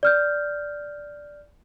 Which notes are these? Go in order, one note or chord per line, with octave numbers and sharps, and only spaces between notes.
D5 F6 G6